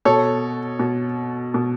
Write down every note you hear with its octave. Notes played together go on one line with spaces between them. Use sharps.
B2 A4 C#5
B2
B2